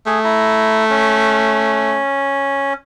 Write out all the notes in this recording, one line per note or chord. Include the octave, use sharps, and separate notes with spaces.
A3 G#4
E4 A#5
C#4